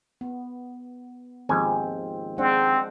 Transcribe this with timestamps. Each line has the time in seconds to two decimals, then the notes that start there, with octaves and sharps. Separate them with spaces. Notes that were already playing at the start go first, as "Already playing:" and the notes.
0.21 B3
1.49 D#2 G#2 F3 C4 G#5
2.38 G#3 C4 D4 F#5